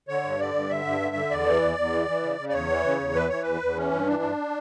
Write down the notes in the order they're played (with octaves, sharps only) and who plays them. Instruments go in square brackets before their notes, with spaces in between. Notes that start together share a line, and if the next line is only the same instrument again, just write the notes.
[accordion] D3 C#5
G2
D3 D5
G2
D3 E5
G2
D3
D3
E2 D5
E3
E2
E2
E3
E3
C#3
C#3
D5
E2 C#5
E3
C#3
E2
E3 B4
E3 C#5
E2 B4
E2
E3 C#4
G2
E3 D4
G2